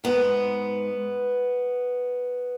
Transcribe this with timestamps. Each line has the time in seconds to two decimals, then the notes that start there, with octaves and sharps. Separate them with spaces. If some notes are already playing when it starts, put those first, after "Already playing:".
0.04 G#2 G#3 B3